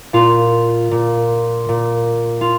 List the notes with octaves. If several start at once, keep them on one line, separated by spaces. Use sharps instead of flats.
A#2 F4
A#2
A#2
F4